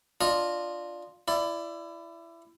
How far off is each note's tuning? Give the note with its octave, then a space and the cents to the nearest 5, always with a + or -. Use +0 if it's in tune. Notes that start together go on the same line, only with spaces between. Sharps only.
D4 +0 F4 +0 D#5 -20
E4 +25 D5 +0